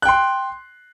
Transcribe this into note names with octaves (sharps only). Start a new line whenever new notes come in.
G5 C6 F#6